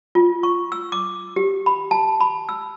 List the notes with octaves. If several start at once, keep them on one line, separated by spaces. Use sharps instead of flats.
F4
C#6
E6
D6
G4
B5
A5
B5
E6